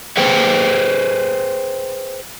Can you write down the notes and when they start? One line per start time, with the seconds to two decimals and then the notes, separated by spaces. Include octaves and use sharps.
0.17 G#4 B4 C5 G5